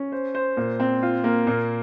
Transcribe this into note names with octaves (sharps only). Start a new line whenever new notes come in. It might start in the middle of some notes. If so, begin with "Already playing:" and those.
Already playing: C#4
C5
C5
A#2
C4
F4
A#3
A#2